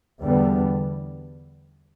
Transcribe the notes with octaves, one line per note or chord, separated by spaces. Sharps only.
E2 D3 G3 B3